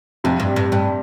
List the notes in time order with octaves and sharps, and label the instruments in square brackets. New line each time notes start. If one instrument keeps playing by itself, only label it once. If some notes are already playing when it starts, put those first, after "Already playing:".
[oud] F2 [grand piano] C3
[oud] G2
G2
G2